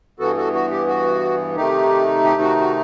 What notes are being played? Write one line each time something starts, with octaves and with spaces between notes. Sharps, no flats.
G2 E3 B3 F#4 A4
F#4 A4
F#4
G4
F#4
C3 D#3 A3 D#4 G4
G4
F#4
F#4